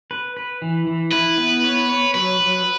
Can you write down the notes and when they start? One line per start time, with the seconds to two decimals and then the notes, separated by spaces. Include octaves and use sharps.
0.11 B4
0.37 B4
0.62 E3
0.87 E3
1.12 E4 B4
1.38 B3
1.64 C#5
1.89 C#5
2.14 F#3 B4
2.40 F#3